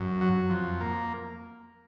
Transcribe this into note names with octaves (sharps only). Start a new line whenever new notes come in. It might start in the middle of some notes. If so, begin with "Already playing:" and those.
Already playing: F#2
F#3
F2
A#3